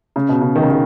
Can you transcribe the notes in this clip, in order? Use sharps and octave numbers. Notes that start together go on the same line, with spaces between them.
C#3
B2
C#3
D#3
C#3
D#3